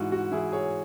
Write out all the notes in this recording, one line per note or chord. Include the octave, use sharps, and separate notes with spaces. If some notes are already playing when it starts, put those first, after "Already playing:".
Already playing: G#2 E3 E4 F#4
F#4
E3 E4 G#4
G#4 C#5